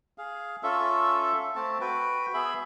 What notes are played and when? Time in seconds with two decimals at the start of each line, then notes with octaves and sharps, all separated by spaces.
0.18 G#4 F5
0.63 C#4 F4 A4 E5
1.56 A3 C4 A5
1.81 F#4 B4 G5
2.34 B3 G#4 E5 B5